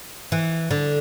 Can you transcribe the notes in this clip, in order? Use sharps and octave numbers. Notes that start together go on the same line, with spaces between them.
E3
D3